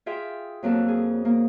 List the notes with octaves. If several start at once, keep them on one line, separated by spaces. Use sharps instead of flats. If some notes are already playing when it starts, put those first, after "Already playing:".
F4 G#4 E5 G5
F2 F#3 A#3 A4
G#4
A#3